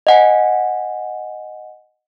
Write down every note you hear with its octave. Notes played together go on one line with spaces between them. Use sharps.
D#5 F#5 G#5